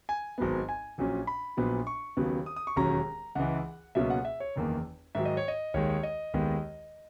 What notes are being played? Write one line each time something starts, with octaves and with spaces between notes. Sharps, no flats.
G#5
G#1 G#2 F#3 B3
G#5
A#1 A#2 F#3 C#4
B5
A#1 A#2 F#3 B3
C#6
D#2 C#3 F#3 B3
D#6
D#6
C#6
E1 D#2 D#3 F#3 C#4 A#5
C#2 C#3 E3 F#5
C#2 B2 F#3 A#3 C#4 E5
F#5
E5
C#5
F#1 E2 D#3 A#3
G#2 D#3 F#3 E5
D#5
C#5
D#5
D#2 D#3 G#3 C#5
C#5
D#5
D#2 D#3 G#3 B3